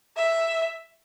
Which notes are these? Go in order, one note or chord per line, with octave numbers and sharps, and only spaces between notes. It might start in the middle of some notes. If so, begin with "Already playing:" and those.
E5